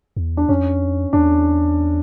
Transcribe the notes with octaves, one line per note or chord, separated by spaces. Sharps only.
E2
D4
F2 C#4
E2 D4